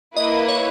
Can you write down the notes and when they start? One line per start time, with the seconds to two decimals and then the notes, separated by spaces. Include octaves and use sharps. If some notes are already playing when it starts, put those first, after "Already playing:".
0.16 A#3 E4 B4 D#5
0.48 C#5